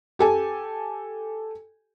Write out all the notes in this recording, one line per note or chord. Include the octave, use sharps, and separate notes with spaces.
G4 A4 G#5